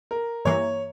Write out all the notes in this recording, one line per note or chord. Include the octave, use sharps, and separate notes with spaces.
A#4
G2 E3 A#3 C#5